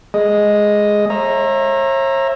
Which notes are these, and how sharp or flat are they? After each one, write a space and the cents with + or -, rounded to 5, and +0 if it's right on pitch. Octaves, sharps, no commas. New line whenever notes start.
G#3 +0 D#5 +0
C#5 -45 E5 +15 A#5 +0